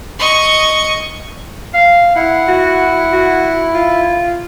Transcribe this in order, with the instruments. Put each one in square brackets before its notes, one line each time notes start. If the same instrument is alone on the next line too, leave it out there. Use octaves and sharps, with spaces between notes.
[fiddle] D#5 C#6
[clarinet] F5
[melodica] E4 [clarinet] F#5
[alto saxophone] F#4
F#4
F4